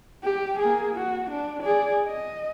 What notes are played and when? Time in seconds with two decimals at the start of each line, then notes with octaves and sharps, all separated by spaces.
0.24 G4
0.59 A#3 G#4
0.96 F#4
1.31 D4
1.63 G#4 D5
2.05 D#5